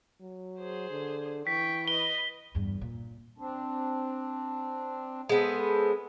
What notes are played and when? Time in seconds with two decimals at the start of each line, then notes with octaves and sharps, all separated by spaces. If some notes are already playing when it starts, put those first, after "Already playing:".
0.21 F#3
0.60 G#4 C5
0.91 D3
1.47 E3 G5 C#6 B6
1.88 B4 D#5 G7
2.55 E2 G2
2.81 A#2
3.38 C4 D4
5.29 G#3 B3 A4 C5